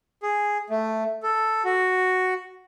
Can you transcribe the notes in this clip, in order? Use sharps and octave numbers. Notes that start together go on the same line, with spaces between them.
G#4
A3
A4
F#4